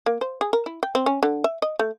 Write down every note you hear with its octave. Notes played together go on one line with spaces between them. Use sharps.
A#3
C5
G#4
A#4
E4
G5
C4
C#4
D3
E5
D#5
A3